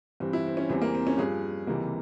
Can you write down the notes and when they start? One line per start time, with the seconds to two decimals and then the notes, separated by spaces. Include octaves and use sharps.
0.20 G2 E3 G3 C4
0.33 E4
0.47 C4
0.57 C#4
0.69 E2 E3 G3 C4
0.82 A#3
0.95 C4
1.07 C#4
1.18 G2 F3 G#4
1.67 C#2 C3 E3 G3 A#3